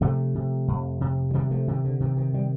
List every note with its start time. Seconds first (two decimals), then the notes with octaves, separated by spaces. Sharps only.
0.01 C3 F3 A3
0.35 C3
0.68 F2
1.01 C3
1.31 F3
1.34 C3 D#3 G3
1.51 F3 A3
1.68 C3 D#3
1.85 D3
2.00 C3 D#3
2.17 D#3
2.33 D#3 G3